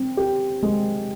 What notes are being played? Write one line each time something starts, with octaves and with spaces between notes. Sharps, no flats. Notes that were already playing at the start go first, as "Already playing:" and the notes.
Already playing: C4
G4
G#3